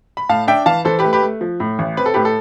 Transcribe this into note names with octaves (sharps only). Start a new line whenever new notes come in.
B5
A2 F5 A5
D4 E5 G5
E3 F5 A5
E3 A4 C5
G4 B4
A3
G4 B4
A3
F3
A2
A1
C4 B4
A4
A2 G4 B4
A4